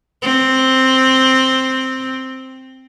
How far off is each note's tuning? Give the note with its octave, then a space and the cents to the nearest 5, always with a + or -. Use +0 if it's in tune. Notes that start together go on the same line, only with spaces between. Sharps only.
C4 +0